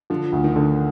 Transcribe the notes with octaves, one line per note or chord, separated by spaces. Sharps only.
D3 F3
D2
D#3
D3